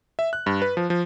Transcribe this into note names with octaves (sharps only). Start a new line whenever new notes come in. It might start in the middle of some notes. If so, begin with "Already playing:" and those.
E5
F#6
G2
B4
F3
F3